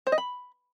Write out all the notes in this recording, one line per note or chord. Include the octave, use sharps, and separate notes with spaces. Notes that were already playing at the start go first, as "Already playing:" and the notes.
C5
D#5
B5